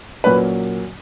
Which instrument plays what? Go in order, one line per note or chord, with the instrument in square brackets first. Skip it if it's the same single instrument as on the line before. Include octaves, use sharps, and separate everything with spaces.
[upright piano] A#2 F#3 A#3 C#4 B4